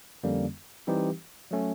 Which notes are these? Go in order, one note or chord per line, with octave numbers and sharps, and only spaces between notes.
F2 D3 G3 A#3 C#4
E3 G3 C4 D#4 G4
F#3 A3 C#4